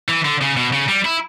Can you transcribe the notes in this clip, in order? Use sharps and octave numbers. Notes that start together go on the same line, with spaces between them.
E3
D3
C#3
B2
C#3
G3
E4